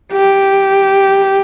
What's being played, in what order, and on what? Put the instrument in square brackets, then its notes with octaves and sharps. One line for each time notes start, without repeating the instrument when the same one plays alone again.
[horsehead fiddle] G4